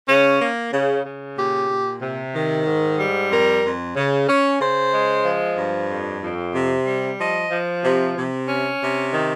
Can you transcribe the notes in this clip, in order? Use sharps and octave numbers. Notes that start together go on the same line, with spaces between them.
C#3 C#4
A#3
C#3
C#3
A#2 G4
A#2
C3
D#3
G#2
G3
F2 A#4
F2
C#3
C#4
C#3 C5
G#3
F3
G2
F2
F2
C3
G3
F3 D#5
F3
C3
C3
C#4
C3
D#3